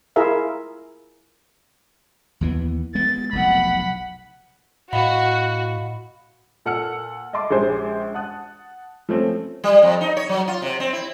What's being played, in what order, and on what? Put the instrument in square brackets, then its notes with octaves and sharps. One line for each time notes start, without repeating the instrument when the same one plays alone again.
[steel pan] E4 F4 G#4 A#4 E5 F5
[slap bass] D#2 E3 B3
[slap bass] G#3 B3 [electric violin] A6
[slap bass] F1 B1 [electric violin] F#5 B5
[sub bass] A2 [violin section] F#4 [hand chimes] D#5 F5 B5
[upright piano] A#2 A4 F#5 E6 F6 C#7
D#5 E5 A5 C6 D6
A#1 G#3 C#4 G4 C5 G#5
F#5 A5 D#6 F#6
F3 A3 C4 C#4
[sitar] G3
F2
D#4
C#5
F#3
F4
C3
C4
E4